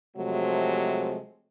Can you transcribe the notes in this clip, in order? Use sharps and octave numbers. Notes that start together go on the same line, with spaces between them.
C3 F3 F#3 G#3 A3